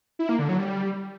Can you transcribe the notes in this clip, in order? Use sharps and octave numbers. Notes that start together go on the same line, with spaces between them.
E4
A#3
D3
F#3
G3